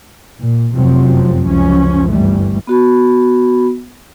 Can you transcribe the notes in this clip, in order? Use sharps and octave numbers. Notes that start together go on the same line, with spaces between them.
A#2
F1 F#2 C3 F3 F#3 C4
C#2 F#2 F3 C#4
G1 E3 G3 A3
B3 F#4 B5